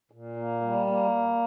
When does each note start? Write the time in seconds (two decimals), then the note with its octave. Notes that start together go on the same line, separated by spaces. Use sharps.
0.11 A#2
0.36 A#3
0.61 G3
0.86 A#3